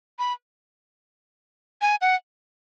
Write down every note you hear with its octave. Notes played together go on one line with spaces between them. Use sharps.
B5
G#5
F#5